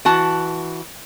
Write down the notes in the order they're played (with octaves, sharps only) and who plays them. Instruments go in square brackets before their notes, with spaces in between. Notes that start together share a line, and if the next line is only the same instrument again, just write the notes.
[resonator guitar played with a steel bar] E3 F#4 A5